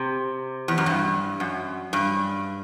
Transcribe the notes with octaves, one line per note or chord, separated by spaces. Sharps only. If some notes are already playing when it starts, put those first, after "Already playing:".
Already playing: C3
E2
F#2
G2
F#2
G2